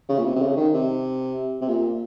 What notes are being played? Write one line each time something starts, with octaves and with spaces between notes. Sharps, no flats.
C#3
A#2
C3
C3
C#3
D#3
C3
C3
A#2